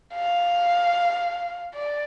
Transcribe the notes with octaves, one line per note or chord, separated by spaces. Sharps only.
F5
D5